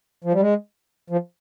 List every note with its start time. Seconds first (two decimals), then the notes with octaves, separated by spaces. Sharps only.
0.24 F3
0.33 G3
0.40 G#3
1.10 F3